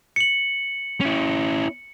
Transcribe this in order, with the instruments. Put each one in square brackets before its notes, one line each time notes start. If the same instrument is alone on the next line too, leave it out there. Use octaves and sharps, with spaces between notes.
[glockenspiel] C#7 F#7
[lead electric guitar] C#4 E4